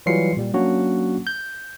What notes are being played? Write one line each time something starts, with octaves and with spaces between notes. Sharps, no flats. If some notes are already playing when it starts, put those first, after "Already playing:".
E3 F#3 G3 F4 C7 C#7
A#2 G3
F#3 A#3 C#4 D4 F#4
G6